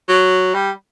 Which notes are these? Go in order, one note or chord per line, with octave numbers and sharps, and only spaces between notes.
F#3
G3